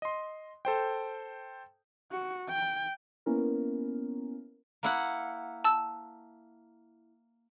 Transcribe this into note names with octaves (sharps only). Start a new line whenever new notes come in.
D#5 C6
A4 C5 G5
F#4
G5
A#3 B3 C#4 E4 A#4
A#3 E4 F#5
A5 E6